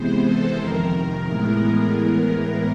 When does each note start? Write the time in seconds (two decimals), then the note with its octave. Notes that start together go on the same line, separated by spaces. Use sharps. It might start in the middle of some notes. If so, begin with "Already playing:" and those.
Already playing: C3 E3 G#3 B3 C5
0.22 A4
0.57 F2 C3 D#3 A#4
0.91 A#4
1.25 A2 E3 G#3 B3 A#4